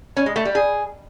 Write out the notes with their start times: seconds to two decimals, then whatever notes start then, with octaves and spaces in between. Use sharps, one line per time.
0.17 C#4
0.26 G#3
0.36 A3
0.45 G3
0.55 G#4